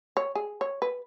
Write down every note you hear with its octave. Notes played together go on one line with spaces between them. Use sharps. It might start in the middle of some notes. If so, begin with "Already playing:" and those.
C#5
G#4
C#5
B4